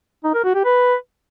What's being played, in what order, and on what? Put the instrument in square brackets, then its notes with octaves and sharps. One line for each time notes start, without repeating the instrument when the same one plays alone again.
[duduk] D#4
A#4
F#4
G4
B4